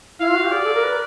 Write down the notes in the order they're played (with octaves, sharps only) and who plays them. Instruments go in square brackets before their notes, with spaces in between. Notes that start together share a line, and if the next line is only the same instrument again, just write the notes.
[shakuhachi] E4 [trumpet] F5
[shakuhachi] F4
F#4
G4
[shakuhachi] G#4 [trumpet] D5
[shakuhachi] A4
A#4
B4